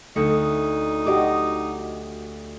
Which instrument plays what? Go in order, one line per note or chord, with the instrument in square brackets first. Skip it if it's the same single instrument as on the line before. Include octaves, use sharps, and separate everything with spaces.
[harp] D2 C#7 [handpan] A3 [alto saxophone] D#4
[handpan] F#4 G4 D#5 [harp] D6